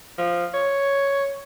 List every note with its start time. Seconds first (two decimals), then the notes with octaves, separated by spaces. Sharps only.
0.18 F3
0.54 C#5